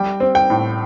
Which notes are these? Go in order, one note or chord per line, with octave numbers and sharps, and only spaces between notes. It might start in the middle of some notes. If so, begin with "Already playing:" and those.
Already playing: G3 G5
C4
G5
A2